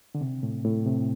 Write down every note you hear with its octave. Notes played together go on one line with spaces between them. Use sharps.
D3
C3
A2
A2
C3